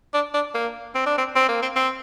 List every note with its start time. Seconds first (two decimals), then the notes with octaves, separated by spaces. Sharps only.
0.14 D4
0.34 D4
0.55 A#3
0.95 C4
1.06 D4
1.18 C4
1.36 C4
1.49 A#3
1.63 C4
1.76 C4